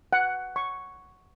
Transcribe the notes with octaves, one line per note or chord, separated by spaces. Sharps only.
F#5
C#6